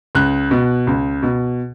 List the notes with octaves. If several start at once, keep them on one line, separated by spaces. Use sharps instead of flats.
C#2 F#6
B2
C#2
B2